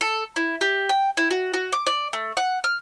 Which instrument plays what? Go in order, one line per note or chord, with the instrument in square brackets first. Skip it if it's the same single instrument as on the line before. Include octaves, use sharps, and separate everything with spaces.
[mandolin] A4
E4
G4
G5
E4
F#4
F#4
D6
D5
A3
F#5
F6